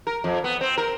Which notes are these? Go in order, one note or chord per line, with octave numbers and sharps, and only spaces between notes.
A#4
F2
B3
C4
A#4